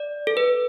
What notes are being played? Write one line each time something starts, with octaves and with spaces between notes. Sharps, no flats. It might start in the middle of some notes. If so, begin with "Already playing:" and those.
Already playing: D5
A4
B4